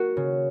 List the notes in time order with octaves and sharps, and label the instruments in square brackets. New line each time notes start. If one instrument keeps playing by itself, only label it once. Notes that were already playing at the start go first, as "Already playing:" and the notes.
Already playing: [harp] A#3 F#4
C#3